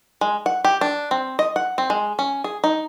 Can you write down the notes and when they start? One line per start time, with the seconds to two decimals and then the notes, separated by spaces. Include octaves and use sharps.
0.21 G#3
0.46 F#5
0.65 G4
0.81 D4
1.11 C4
1.39 D#5
1.56 F#5
1.78 C4
1.90 G#3
2.19 C#4
2.44 G#4
2.64 D#4